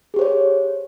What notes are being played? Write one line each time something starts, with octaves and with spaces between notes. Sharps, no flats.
G4 G#4 C5 C#5